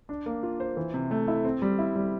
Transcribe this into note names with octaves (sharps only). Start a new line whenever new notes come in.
D4
A#3
F4
C5
E3
C3
A3
E4
C4
G3
E4
G3